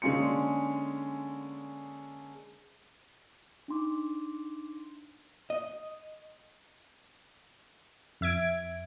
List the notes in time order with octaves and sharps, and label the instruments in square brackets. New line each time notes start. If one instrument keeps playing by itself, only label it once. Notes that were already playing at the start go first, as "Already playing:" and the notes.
[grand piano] D3 G#3 A#3 C#4 C6 C#7
[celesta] D4 D#4 C6 D6
[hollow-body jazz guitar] D#5
[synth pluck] F2 E5 G#6 D7